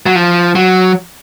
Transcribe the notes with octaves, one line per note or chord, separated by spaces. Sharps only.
F#3
F3
F#3